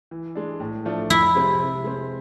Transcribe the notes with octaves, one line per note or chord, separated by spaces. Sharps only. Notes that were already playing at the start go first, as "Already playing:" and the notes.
E3
G#3 D4
A2
F3 A3 D4 F4
F2 E4
C3 G#3 C4
C3
G#3 C4